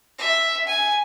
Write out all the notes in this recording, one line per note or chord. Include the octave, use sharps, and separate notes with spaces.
E5
G#5